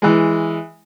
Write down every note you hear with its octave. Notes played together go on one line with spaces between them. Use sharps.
E3 G#3